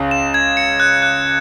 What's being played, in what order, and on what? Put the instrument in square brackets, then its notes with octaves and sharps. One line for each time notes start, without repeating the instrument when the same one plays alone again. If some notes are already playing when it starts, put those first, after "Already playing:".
Already playing: [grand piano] C#2 C#3
[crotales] E7
G#6
C#7
F#6
F#6